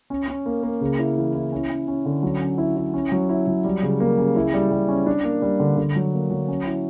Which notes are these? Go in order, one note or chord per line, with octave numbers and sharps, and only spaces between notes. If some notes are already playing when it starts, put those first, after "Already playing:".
C#4
C#4
A#3
A#3
C#3
E4
E3
E4
C#4
C#4
C#4
D3
F#3
C#4
E4
E4
C#4
F#3
E4
F#3
G3
C#3
A#3
C#3
E4
G3
G3
C#4
D4
A#3
G3
D3
D3
F#3
A#3
F#3
C#4
E4